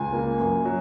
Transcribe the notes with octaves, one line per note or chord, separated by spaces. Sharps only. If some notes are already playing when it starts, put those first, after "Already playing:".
Already playing: C#2 G#5
A#3
F#2
F#3